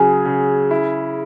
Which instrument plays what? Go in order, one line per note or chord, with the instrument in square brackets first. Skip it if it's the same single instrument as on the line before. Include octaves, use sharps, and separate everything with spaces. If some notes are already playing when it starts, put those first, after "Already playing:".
Already playing: [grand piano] C#3 F#3 [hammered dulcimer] G#4
[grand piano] C#3
E4